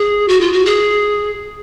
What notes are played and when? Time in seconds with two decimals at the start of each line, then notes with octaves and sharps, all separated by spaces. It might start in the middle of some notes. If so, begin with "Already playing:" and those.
Already playing: G#4
0.28 F#4
0.41 F4
0.53 F#4
0.66 G#4